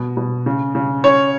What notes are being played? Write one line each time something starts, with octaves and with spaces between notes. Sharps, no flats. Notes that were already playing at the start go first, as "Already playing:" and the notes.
Already playing: B2
B2
C#3
C#3
C#4 C#5